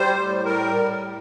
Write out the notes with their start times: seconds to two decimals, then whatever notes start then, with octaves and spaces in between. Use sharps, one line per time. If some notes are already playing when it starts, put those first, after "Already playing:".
Already playing: G3 C5
0.15 A2
0.45 G3 A#4
0.76 A2
1.05 G3